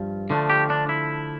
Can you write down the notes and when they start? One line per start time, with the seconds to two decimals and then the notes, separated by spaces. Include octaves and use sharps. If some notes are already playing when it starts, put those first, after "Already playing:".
Already playing: G2 F3
0.30 D3 F3 A3 D4
0.50 G4
0.70 D4
0.89 E4